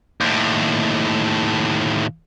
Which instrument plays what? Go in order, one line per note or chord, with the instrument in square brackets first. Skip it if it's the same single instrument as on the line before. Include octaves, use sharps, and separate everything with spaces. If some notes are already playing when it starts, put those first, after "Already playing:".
[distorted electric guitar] D#2 A2